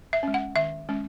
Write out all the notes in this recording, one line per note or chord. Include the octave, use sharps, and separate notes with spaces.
E5
G#3 C#4
F#5
D#3 E5
G#3 C#4